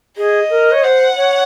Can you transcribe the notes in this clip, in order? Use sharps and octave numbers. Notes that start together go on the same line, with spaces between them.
G#4 D#5
A#4
C#5
C5 F#5
C#5